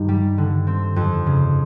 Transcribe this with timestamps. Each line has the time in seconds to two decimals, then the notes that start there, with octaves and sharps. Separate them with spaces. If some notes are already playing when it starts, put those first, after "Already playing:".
Already playing: G2 D#3
0.08 G3
0.38 D3
0.67 C4
0.96 F2
1.26 C#3